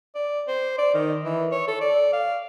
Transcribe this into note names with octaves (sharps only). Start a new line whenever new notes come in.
D5
C5
D5
D#3
E3
C#5
A4
D5
F5